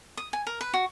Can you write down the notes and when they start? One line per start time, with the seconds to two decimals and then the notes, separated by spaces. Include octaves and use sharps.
0.17 D#6
0.33 G#5
0.47 A#4
0.61 B4
0.74 F#4